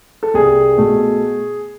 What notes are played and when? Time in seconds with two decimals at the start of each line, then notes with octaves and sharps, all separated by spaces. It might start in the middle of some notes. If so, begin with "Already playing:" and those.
0.23 A4
0.34 C2 G#4
0.78 B2 A3